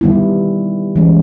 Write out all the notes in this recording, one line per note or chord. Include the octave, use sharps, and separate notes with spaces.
D#3 G3 B3 E4
E3 G#3 C#4